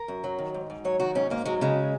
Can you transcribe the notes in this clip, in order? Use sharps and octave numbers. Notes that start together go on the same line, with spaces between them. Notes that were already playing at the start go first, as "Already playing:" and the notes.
Already playing: A#4
F#2
F#3
D#3
G#2
G#2
F#3 C#5
D#3 F#4
G#2 C#4
G#2 A#3
F#3 G#3
C#3 G#3